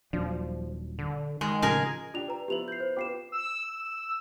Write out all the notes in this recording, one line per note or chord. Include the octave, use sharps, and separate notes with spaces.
D#1 F3 F#3 D4
D3
D#3 G#3
A2 C#3 F3 G#4 A#4 G#5
D4 F4 G4 F7
B4 A#5
F3 B3 E4 G4 F7 F#7
G6 C7
C5
B3 F4 G4 D6 C7 E7
E6